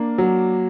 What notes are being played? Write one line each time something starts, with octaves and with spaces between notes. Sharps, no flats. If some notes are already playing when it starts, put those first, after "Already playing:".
Already playing: A#3 D4
F#3